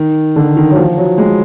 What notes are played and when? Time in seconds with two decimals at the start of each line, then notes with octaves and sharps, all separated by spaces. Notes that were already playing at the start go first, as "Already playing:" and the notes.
Already playing: D#3
0.36 D3
0.57 D#3
0.71 F#3
0.76 F3
0.97 F#3
1.18 G#3